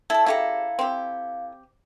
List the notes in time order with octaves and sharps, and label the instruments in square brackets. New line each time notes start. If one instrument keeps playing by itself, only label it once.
[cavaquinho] E4 D5 [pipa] A4
[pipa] C#3 F#4 G4 [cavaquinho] E4 A4 A#5 [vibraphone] F5
[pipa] C4 G4